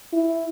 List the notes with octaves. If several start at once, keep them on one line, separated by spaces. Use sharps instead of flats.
E4